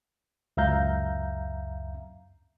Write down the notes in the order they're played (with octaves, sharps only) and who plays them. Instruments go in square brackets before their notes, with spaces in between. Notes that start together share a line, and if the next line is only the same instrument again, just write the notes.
[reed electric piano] C#2 F#2 E5 F5 A#5 G6